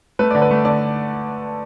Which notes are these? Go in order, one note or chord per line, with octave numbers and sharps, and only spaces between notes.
A3 B4
D3 D5
B4
A3
D3 D5